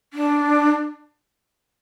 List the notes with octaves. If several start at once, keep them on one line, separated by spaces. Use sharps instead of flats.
D4